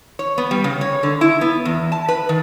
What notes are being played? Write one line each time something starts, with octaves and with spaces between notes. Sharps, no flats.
C#5
B3
G3
C#3
C#5
D3
E4
B3
E2
A5
B4
D#3